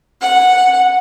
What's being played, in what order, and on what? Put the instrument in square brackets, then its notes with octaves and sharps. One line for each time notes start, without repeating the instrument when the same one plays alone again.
[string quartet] F#5